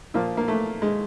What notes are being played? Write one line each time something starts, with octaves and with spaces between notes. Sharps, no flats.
A#2 F3 A#3
A#3
A3
G#3